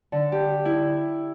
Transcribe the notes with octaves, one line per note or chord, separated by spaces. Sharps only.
D3
G4
E4